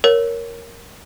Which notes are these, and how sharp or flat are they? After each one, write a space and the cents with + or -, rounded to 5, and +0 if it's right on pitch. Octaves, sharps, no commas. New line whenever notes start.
A#4 +0 C#5 +0